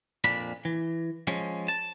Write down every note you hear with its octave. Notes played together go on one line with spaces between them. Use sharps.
F2 A#2 D4 B5
E3
F3 G#3 C#4
A5